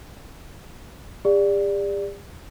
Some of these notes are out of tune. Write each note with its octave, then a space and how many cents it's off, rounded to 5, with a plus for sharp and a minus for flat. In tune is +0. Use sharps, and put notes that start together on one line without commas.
G4 +45 D5 +0 F5 -15